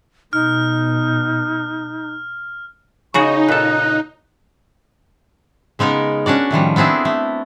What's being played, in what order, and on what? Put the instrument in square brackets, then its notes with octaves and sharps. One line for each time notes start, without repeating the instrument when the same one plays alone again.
[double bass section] B2 [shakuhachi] D#4 [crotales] F6
[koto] C#3 F#4 G#4 [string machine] D#4 [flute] C#6
[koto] A#2 A4 [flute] F#6
[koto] C#3 G#3 B3 D#4 A#4
C#4 D4 F#4 D5
A2 D#3 F3 G3
B3 C4 D4 E4 G#4
A3